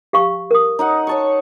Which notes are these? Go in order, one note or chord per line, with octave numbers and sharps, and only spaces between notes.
G4 F5 C#6
A#4 D#6
D#4 D#5 F#5
C#5 A5 C#6